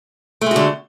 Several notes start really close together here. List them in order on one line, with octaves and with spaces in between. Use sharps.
A3 G#3 F#4 D3